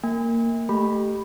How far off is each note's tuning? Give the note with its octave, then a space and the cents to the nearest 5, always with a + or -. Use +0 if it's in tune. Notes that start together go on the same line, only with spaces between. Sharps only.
A#3 -15 G#5 -40
A3 +0 G4 +0 B5 +0